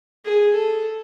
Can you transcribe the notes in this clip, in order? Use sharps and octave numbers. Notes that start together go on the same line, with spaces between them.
G#4
A4